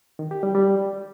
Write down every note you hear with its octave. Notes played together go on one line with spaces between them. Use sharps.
D#3
G4
G3
G3